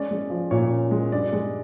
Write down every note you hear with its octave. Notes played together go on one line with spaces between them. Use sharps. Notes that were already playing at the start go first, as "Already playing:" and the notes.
Already playing: G#3 C#4 D5
G#3
F3
A#2 C#5
C#4
G#3
G2 D5
G#3